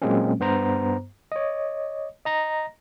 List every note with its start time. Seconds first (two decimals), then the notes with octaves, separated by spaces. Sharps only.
0.02 A#2 F#3 G#3 A#3 C4 C#4
0.40 G2 B3 C5 A#5
1.32 C#5 D#5
2.25 D#5 A#5 A#6